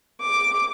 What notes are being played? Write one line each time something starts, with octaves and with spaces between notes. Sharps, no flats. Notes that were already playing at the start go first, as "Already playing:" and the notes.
D6